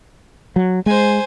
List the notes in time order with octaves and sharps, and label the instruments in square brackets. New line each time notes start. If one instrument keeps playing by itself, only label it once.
[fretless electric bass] F#3
[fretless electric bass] G#3 [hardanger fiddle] C5 G#5